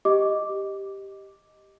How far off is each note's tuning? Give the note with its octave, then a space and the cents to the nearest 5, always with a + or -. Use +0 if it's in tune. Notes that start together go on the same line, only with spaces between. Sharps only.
G4 +0 D#5 +0 D6 +0